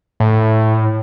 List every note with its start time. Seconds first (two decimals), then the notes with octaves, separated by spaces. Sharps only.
0.20 A2